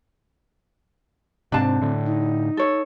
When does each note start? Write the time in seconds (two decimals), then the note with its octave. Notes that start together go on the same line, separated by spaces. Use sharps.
1.52 G#2 C3 C4 D4 A5
1.81 A2 D3
2.06 D#4
2.57 A4 C#5